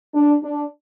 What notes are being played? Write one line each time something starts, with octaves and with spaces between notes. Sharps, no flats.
D4
D4